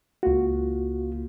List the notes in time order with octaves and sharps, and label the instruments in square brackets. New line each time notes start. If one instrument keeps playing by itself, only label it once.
[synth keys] C#2 A#3 F4 [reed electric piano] F#4